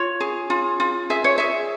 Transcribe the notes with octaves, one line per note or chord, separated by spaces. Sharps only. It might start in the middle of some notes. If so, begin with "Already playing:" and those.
Already playing: F4 C#5
G#4
F4
F4
G#4 E5
C#5
G#4 E5